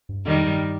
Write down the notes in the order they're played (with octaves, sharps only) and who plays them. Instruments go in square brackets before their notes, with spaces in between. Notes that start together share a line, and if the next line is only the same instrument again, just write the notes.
[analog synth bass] G2
[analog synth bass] F2 [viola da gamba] D#3 G3
[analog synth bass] G2